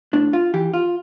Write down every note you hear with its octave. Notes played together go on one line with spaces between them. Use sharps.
A2 D4
F4
E3 G4
F4